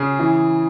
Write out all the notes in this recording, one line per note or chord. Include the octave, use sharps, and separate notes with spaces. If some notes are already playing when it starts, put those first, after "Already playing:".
Already playing: C#3 G#4
E3